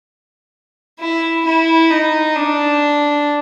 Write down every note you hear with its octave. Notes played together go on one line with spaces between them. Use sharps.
E4
E4
D#4
D4